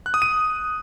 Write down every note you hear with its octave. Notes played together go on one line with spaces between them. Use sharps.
F#6
D#6
D#7